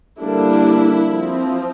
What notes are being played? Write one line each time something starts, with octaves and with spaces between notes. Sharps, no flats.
D3 G3 A#3 D4 E4
F3 C4